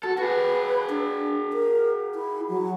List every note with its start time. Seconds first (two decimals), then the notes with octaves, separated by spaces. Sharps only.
0.04 F#4 A4
0.18 F#4 G#4 B4
0.90 D4
1.53 A#4
2.15 E4
2.49 F#3